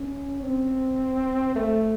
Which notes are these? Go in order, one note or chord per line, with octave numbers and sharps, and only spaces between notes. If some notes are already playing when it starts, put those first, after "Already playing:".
Already playing: C#4
C4
A3